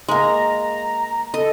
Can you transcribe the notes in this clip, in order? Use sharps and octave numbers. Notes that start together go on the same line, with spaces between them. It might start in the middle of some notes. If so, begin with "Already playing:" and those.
G#3 A#3 A#5
A4 D#5